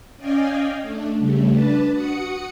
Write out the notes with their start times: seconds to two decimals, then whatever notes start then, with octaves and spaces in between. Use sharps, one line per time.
0.17 C#4 D5 D#5 F5 G5 G#5
0.81 A3 D4
1.18 C#3 G3 A3
1.50 D4 B4 A5
1.92 F#4 F#5 D#6 C#7